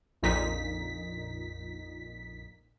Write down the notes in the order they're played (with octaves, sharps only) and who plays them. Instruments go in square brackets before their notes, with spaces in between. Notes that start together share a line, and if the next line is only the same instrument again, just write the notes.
[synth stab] A#1 F2 A#2 D#4 B6